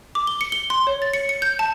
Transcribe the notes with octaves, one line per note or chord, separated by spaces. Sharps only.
D6
G7
C#7
G7
C6
C#5
A6
C#7
C#7
G6
A5